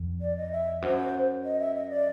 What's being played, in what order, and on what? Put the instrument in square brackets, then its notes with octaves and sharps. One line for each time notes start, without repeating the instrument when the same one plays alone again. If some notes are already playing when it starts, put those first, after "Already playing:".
Already playing: [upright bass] F2
[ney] D5
D#5
E5
[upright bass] F#2 [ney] C5
[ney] D#5
E5
D#5
D5